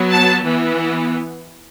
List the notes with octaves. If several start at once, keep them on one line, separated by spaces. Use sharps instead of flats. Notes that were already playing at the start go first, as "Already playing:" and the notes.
Already playing: F#3 B3
A5
E3 B3